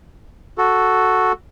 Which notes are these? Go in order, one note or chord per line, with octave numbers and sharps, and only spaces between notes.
F#4 A4